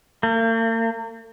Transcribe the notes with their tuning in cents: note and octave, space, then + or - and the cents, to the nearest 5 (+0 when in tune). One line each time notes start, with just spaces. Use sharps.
A#3 -45